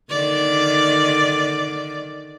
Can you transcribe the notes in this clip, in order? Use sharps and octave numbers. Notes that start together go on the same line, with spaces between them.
D3 D#3 D5